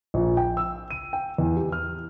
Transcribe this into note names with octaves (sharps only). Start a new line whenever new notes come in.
A#1
G5
E6
D#7
G5
E2
G4
F6